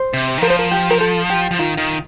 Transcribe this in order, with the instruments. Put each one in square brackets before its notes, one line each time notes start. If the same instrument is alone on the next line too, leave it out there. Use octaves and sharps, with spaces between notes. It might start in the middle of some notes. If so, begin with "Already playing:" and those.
Already playing: [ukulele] C5
[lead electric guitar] C3
D#3
[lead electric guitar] F3 [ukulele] A#4
[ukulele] C5
A#4
G4
A#4
A4
G4
[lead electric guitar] F3
[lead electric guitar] D#3 [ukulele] F4
[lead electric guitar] D#3